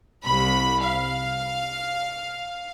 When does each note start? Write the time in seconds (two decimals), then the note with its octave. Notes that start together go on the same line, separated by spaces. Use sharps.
0.23 C2 B5
0.81 F5